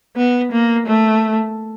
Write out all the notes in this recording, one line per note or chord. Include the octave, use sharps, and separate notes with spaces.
B3
A#3
A3